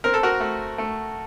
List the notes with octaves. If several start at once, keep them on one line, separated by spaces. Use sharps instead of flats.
C4 A#4
A4
F#4 A#4
A3
A3